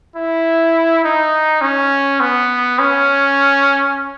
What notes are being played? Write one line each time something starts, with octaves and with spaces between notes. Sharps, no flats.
E4
D#4
C#4
B3
C#4